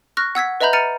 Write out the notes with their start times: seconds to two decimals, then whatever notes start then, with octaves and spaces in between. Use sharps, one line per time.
0.17 C#6 F6 F#6 A#6
0.35 F#5 E6 G#6 B6
0.61 B4 D#5 E5 A#5 B5 G6
0.73 A#5 F6 A6 C#7 D#7